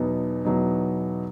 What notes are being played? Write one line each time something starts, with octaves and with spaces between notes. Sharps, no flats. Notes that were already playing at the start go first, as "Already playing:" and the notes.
Already playing: E2 B2 F#3 B3 D#4
E2 B2 F#3 B3 D#4